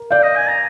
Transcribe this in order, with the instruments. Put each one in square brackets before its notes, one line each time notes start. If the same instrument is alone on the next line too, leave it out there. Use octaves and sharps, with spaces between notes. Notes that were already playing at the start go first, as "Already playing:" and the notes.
Already playing: [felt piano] A#4
[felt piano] D5 F5 [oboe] G5
[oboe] D#5
G#5
A#5